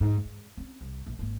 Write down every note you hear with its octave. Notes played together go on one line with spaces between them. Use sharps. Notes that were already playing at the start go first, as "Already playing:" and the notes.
E2 G#2
G#2
C4 C#4
C2
A#1
G#1 A#3